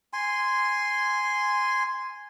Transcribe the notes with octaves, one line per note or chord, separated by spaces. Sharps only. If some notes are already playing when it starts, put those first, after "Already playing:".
G#5 C6